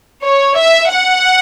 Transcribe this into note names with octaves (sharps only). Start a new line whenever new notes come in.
C#5
E5
F#5